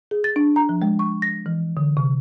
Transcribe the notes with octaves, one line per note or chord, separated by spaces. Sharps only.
G#4
A6
D4
A#5
F3
G#3
C#6
A#6
E3
D3
C3